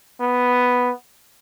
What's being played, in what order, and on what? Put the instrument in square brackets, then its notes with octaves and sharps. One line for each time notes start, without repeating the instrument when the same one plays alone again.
[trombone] B3